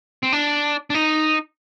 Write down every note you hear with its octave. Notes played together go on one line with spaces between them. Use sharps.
C4
D4
D4
D#4